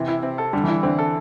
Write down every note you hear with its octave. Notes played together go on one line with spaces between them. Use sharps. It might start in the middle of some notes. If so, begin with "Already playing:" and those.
Already playing: C3 E3
E4
C4
A4
D3 G3
E3
E4
D3 C4
A4